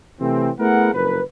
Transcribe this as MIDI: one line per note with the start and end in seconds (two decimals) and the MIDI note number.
0.21 0.51 48
0.21 0.51 52
0.21 0.51 57
0.21 0.51 60
0.60 0.90 57
0.60 0.90 59
0.60 0.90 64
0.60 0.90 68
0.60 0.90 70
0.60 0.90 78
0.94 1.20 30
0.94 1.20 41
0.94 1.20 70
0.94 1.20 71